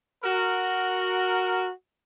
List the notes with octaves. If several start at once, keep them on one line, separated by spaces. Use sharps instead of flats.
F#4 A#4